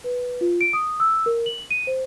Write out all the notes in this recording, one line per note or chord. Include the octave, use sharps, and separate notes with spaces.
B4
F4
D7
D#6
E6
A#4
F#7
D#7
C5